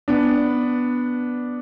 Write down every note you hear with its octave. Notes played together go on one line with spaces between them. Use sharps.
B3 D4